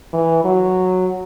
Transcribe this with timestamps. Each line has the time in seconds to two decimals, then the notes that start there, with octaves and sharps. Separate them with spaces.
0.13 E3
0.44 F#3